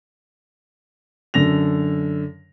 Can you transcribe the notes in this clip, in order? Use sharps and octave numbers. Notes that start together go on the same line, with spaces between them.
F#2 D3 A#6 F7